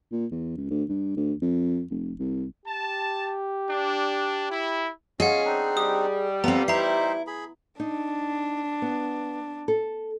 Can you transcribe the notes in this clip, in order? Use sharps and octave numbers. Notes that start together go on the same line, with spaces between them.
A#2
E2
C#2
D2
G2
D2
F2
F1
C2
G4 A5
D4
E4
C#4 F4 G#4 D#5 F#5
C4 D4 D#4
G3 D#6
B3 C4 F4 A4 A#5
D#4 E4 C5 E5 A#5 C7
G#4 B5
D4 D#4
B3
A4